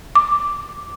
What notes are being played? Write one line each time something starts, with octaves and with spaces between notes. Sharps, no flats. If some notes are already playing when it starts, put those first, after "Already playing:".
D6